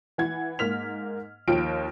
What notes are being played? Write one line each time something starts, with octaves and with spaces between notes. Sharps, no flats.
E3 F#5 G#6
G#2 A#3 F6 B6 F7
D#2 F3 F4 G5 F6 D7